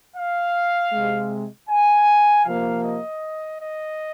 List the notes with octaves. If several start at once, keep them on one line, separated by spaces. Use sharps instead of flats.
F5
G#3
C3
G#5
C3 F3 A#3 F5
D#5
D#5